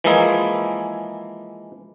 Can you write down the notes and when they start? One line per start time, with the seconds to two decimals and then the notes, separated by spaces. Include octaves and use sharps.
0.04 E3 F3 G#3 A#3 E4 G#4